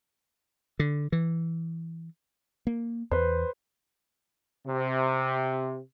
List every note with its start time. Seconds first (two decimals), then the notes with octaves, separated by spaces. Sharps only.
0.79 D3
1.12 E3
2.67 A#3
3.11 E2 B4 C5
4.67 C3